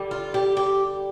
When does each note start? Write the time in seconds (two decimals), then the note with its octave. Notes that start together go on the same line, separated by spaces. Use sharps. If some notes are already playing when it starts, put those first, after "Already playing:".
Already playing: D3 G3
0.11 F4
0.34 G4
0.57 G4